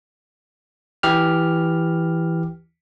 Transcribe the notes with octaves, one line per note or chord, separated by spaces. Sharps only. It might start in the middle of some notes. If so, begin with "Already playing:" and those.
E3 G4 F6